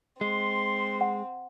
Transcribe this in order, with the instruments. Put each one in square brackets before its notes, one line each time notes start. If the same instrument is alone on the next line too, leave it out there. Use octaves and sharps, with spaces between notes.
[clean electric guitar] G#3 [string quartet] C4 [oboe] C6
[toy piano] F#5